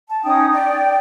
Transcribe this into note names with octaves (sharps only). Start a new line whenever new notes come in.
A5
C#4 D#4 G5 D#6
D5 G5